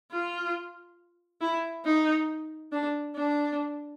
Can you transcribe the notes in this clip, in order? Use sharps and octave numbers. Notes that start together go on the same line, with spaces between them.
F4
E4
D#4
D4
D4